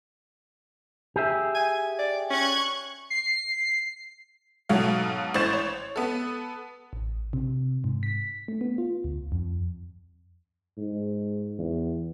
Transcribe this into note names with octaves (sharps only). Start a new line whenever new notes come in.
G4 G#4 E5
G#5
D5
C#4 C#6 F#6 G#6
C7
G#2 B2 F#3 A4 F5
A1 E3 C5 C#6 A6 E7
C#5
B3 A4
A1
C3
G#2
B6
A3
B3
F4
D2
F2
G#2
E2